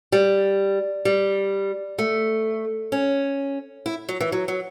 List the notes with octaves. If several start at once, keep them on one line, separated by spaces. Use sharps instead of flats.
G3
G3
A3
C#4
E4
F#3
E3
F#3
F#3